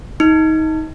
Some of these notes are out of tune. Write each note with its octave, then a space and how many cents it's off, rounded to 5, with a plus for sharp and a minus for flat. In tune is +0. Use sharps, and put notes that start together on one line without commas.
D#4 +25